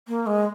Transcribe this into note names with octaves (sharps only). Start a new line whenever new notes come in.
A#3
G#3